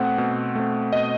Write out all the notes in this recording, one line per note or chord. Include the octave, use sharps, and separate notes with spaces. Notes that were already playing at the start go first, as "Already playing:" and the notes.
Already playing: B2 A3 C4 F#5
B2
A3 C4
B2 D#5